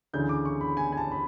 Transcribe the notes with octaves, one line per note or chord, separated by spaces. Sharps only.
D2 C#3 E3 G6
D6
C#6
B5
G#5
G#5
A5
B5